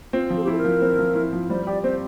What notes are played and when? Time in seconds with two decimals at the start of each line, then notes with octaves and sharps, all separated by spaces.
0.13 C4 F4
0.30 F3
0.36 A4
0.44 G4
0.47 E4 A4
0.58 A#4
0.64 F3
0.82 C4
0.99 F3
1.15 E4
1.33 F3
1.49 G3 C5
1.67 G4 D5
1.84 C4 C5